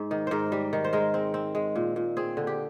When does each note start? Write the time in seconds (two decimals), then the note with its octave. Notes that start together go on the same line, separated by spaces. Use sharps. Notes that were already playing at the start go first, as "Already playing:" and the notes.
Already playing: G#2 G#4 C5
0.11 D#3
0.27 G#2 A#4 C5
0.52 G3
0.73 D#3
0.84 C5
0.93 G#3 A#4
1.14 C4
1.34 C4
1.55 G#3
1.76 A#2
1.96 A#2
2.17 C4 G#4
2.37 D3
2.47 G4